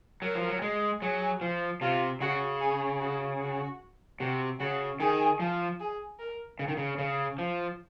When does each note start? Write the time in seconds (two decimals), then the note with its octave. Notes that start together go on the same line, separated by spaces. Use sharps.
0.22 F#3 A#4
0.35 F3
0.48 F#3
0.62 G#3
1.01 F#3 G#4
1.41 F3
1.81 C3 F4
2.21 C#3 F#4
2.61 G#4
3.01 F#4
3.41 F#4
4.20 C3 F#4
4.60 C#3 F#4
5.00 D#3 G#4
5.40 F3
5.80 G#4
6.19 A#4
6.59 C#3
6.68 D#3
6.77 C#3
6.98 C#3
7.38 F3